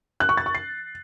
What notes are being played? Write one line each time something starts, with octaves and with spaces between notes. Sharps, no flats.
F#6
C#6
A6
C#6
C7